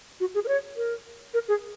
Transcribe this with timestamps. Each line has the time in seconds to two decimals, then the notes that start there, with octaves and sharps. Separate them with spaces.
0.20 F#4
0.35 G#4
0.44 A#4
0.48 C#5
0.77 A#4
1.34 A#4
1.48 G#4